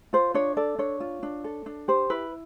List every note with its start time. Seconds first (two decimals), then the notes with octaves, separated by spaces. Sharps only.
0.13 F4 C5
0.34 D4 C#5
0.57 A4 D5
0.79 D4 C#5
1.00 F4
1.23 D4
1.44 A4
1.66 D4
1.88 G4 C5
2.10 E4 B4